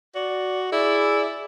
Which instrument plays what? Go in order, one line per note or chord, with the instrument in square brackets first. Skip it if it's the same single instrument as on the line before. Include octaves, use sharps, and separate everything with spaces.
[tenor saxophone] F#4 [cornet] D5
[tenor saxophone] E4 [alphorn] G#4 [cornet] D5